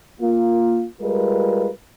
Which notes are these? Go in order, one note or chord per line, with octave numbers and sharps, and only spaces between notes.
A#3 F4
G3 G#3 F4 A#4 B4